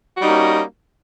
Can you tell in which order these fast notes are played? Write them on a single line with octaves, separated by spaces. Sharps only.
F#4 G3 D#4 A#3 C#4